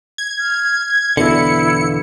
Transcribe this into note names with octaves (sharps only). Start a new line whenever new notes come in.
G#6
F6
E2 B2 D3 E4 F5 C#7